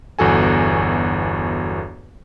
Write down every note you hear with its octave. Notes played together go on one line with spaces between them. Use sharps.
G1 E2 F#4 A4 G#5